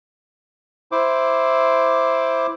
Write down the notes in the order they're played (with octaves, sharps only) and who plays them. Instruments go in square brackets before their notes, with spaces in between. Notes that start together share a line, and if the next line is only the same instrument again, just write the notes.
[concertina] E4 C5 D6